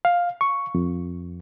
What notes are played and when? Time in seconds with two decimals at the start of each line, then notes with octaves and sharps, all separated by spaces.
0.05 F5
0.41 C#6
0.75 F2